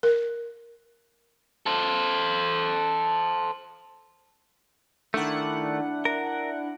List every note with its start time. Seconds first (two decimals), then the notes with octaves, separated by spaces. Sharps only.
0.03 A#4
1.66 A4 C5
5.14 D#3 A3 D4 E4 F#5
6.05 A#4